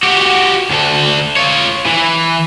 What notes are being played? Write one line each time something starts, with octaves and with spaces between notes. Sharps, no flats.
F#4 G4
D2 A4
F4 C#5
E3